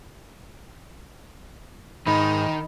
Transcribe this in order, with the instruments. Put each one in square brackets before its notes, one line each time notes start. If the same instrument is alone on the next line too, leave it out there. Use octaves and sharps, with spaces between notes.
[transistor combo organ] G#2 [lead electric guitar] D#3 [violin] D#4 [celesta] B5 F7